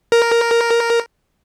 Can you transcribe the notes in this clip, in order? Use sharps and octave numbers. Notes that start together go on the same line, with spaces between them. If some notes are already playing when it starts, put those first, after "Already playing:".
A#4